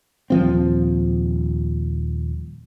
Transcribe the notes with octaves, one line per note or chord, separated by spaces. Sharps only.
D#1 F3 C4